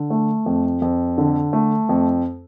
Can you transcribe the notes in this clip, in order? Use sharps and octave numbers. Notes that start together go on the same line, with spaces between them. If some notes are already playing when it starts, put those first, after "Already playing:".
Already playing: D3
A3
F2
F2
D3
A3
F2